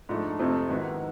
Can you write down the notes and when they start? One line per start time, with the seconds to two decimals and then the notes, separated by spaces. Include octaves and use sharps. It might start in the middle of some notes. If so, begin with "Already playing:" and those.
0.09 G#2 F3 A3 D4
0.39 F2 C3 F3 A3 C4
0.69 G#2 D#3 F#3 B3 E4